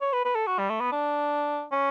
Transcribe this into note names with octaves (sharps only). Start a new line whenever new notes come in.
C#5
B4
B4
A4
F#4
G3
A3
B3
D4
C#4